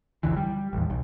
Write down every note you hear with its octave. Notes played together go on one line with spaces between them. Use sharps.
F#1 C#2 D3 E3
G3
A1 D#2
B1